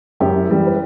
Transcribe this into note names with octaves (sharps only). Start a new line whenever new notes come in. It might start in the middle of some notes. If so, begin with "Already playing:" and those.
F#2 E4 G4
E3 G3
B4